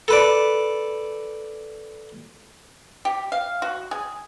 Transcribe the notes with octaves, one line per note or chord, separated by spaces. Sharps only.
A4 B4 D5
G4
F5
F#4
G#4